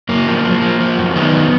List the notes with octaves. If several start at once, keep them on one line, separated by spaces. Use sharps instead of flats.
F#2 A#3
F3
F3
F3
F3
F#2
D#3 B3
F#2